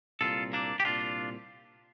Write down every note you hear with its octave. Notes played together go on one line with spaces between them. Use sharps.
C2 A#2 F4 A4
A#3 D4
G4
C2 A#2 D4 F4